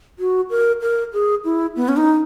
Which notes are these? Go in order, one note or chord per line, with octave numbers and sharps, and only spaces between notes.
F#4
A#4
A#4
G#4
E4
B3
C#4
D#4